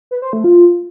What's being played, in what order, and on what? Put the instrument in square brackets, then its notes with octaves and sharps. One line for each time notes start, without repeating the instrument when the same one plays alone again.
[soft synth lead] B4
C5
A3
F4